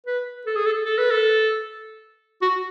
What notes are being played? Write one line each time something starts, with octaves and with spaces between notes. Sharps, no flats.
B4
A4
G#4
A4
A4
B4
A4
F#4